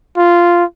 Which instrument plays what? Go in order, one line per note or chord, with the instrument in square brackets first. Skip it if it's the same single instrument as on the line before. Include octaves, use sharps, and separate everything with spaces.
[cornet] F4